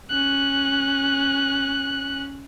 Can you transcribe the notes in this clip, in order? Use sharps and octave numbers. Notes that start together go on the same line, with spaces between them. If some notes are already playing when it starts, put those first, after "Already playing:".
C#4 F#6